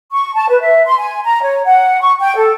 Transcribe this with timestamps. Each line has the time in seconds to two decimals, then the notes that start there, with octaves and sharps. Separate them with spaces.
0.12 C#6
0.34 A5
0.49 B4
0.60 E5
0.86 C6
0.98 G#5
1.24 A#5
1.42 C#5
1.65 F#5
2.01 C#6
2.19 G5
2.36 A4